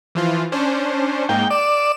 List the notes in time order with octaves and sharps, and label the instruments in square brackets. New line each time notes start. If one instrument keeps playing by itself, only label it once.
[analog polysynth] E3 F3 F4
C#4 D4 C5
[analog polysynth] G#2 A#3 D#4 [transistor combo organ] G5
[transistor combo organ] D5 [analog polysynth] E7